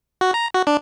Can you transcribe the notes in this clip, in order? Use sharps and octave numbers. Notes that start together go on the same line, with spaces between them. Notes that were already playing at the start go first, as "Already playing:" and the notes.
F#4
A#5
F#4
D4